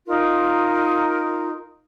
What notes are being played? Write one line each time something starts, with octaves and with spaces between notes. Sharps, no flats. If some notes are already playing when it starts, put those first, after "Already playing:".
D#4 F4 A#4